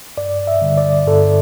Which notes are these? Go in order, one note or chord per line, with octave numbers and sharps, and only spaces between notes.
G2 D5
E5
D3 G3
D5
G2 A4